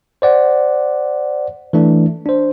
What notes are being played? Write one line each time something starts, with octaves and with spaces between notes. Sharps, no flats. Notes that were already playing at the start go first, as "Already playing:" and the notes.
C5 D5 F#5
E3 A3 D4
D4 C5